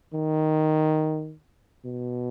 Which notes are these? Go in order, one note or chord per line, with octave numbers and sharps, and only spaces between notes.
D#3
B2